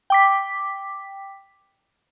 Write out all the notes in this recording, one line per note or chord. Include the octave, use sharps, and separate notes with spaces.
G5 D6 B6